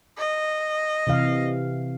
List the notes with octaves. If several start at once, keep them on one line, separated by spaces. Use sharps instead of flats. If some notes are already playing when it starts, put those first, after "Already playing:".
D#5
C3 E3 F5